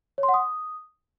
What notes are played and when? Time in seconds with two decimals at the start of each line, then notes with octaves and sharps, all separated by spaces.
0.18 C#5
0.23 C6
0.29 F#5
0.34 D#6